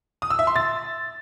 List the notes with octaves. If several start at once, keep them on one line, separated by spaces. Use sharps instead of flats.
D#6
E6
E5
C6
A6